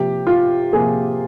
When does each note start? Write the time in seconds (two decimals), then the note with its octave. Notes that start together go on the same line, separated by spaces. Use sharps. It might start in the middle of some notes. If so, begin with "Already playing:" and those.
Already playing: C3 F3 A#3 G4
0.27 F4
0.73 C3 F3 A#3 G#4